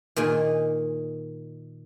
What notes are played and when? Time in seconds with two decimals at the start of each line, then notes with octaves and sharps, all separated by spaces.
0.16 A#2 D#3 G#4